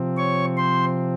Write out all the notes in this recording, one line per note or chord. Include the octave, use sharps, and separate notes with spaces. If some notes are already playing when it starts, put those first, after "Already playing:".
Already playing: C3 F3 C4
C#5 C#6
C5 C6